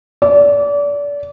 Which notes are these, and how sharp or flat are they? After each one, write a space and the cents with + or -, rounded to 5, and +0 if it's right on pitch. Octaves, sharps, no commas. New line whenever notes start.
D5 -30